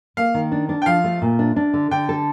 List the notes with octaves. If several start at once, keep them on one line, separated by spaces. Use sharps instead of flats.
A#3 F5
D#3
D4
D4
G5
F3 F5
A3
A#2
D4
D4
D3
D3 G5
A4